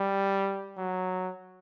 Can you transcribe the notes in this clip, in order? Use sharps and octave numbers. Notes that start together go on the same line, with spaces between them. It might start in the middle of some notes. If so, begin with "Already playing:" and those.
Already playing: G3
F#3